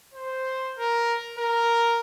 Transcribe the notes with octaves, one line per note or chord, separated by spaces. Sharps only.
C5
A#4
A#4